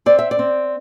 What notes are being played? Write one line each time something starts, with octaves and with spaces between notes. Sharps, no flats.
C4 D5
E5
D5
C4